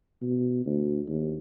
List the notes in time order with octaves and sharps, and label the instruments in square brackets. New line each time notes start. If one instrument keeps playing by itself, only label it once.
[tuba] B2
D2
D#2